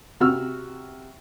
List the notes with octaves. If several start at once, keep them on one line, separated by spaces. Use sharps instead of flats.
C3 F#4 E6 F6